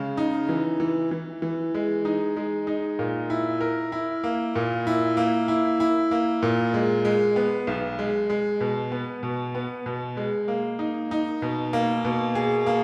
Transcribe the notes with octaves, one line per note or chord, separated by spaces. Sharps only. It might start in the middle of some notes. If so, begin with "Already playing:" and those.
Already playing: C#3 G#3
D#4
E3
E3
E3
E3
G#3
D#4
G#3
D#4
A#2
E4
A#4
E4
A#3
A#2
E4
A#3
E4
E4
A#3
A#2
G#3
G#3
B3
B1
G#3
G#3
B2
B3
B2
B3
B2
G#3
A#3
D#4
D#4
B2
A#3
B2
G#4
A#3